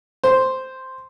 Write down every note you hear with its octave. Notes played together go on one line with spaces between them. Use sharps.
C5